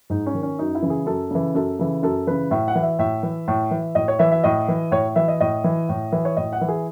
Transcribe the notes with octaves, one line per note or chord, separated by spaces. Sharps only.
G#2 D#4
C#4
D#3
C#4
F#2 D#4
E4
C#3 E3
G#4
F#2 A4
C#3 E3
F#2 A4
C#3 E3
F#2 A4
C#3 E3 B4
A2 E5
F#5
E3
E5
A2 E5
E3
A2
E3
A2 D#5
C#5
E3 E5
E5
A2 D#5
E3
A2 C#5
E3 E5
D#5
A2 D#5
E3
A2
E3
C#5
A2 D#5
F#5
E3
G#4